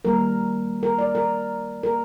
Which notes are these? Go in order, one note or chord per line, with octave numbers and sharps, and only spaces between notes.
D#3 G3 A#3 A#4
A#4
D5
A#4
A#4